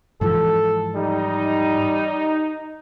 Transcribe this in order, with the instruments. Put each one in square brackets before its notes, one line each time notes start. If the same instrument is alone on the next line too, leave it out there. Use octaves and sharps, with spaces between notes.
[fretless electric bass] G#2 E3 F3 [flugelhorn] A4
[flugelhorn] G3 [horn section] D#4